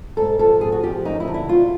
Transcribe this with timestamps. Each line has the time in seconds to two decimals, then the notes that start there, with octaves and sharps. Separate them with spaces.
0.17 G#2 A4
0.39 F3 A4
0.61 G#2 G#4
0.72 F#4
0.83 F3 G4
1.05 F#2 D#4
1.20 E4
1.28 D3
1.34 E4
1.48 F#3 F4